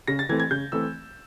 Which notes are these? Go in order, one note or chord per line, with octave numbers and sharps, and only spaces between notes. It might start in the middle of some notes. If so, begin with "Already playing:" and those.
C#3 A#6
A6
E3 A3 C4 G#6
G#6
C#3 G6
E3 A3 C4 E6